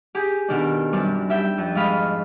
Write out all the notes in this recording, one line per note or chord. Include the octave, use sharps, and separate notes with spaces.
G4 G#4
B2 D#3 D4
F#2 G3 C4 D4
G3 E5 G5
F2
G#2 D#5 F5 B5